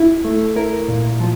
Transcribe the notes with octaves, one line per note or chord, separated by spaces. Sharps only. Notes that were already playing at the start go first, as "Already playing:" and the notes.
Already playing: E4
A3
E4 A#4
A#2
F3